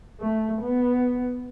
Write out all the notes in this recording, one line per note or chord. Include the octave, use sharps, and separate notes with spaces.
A3
B3